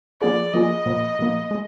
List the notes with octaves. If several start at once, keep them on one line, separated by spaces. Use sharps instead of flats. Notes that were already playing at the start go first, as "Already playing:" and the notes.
F3 A#3 F4 G#4 D5
F3 A#3 F4 G#4 D#5
A#2 F3 A#3
A#2 F3 A#3
G#3